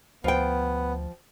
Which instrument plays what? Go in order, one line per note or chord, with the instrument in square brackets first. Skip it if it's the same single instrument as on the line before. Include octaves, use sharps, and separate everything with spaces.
[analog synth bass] D2 [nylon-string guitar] F3 G5 [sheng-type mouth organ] B3